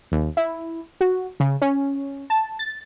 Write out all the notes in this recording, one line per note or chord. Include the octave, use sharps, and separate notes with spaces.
D#2
E4
F#4
C#3
C#4
A5
A6